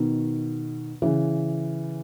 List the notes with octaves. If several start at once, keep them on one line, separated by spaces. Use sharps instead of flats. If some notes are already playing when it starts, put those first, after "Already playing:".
Already playing: B2 D#3
C#3 E3